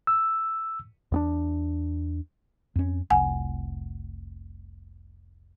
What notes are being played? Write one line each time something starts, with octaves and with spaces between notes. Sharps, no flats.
E6
E2 B3 D4
F2 C#4
F1 C2 F#5 G#5